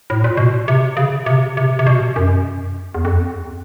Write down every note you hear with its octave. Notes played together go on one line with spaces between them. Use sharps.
A2
A#2
B2
C3
C#3
C3
C3
C3
B2
F#2
E2
F2